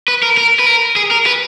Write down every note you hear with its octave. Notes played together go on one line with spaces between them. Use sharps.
B4
A#4
A#4
B4
A#4
G#4
A#4
B4